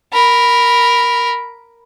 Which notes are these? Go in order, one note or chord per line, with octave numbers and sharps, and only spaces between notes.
A#4 B5